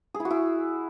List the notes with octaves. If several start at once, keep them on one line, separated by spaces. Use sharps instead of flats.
G#4
E4
F#4
E4